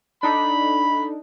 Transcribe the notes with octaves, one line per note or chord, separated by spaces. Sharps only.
D4 D#4 A4 B5